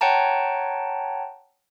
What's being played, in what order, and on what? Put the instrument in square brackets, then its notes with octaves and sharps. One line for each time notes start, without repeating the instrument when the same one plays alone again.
[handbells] C#5 F#5 G5 A5 A#5